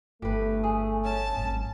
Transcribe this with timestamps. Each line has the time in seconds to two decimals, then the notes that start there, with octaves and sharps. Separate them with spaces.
0.22 G1 A3 G4 B4
0.63 G#4
1.04 C#4 A5
1.35 G#1 G2